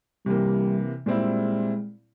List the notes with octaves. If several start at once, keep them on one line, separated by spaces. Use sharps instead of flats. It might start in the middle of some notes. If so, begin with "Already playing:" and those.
C3 E3 G3 A#3
A#2 G3 G#3 C4 E4